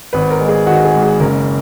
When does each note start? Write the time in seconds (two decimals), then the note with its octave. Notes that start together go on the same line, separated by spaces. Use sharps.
0.13 G#1 B4
0.31 A#4
0.40 G#3
0.49 G#4
0.66 D#3 F#4
0.84 G#4
0.94 G#2
1.02 G#4
1.20 F#1 A#4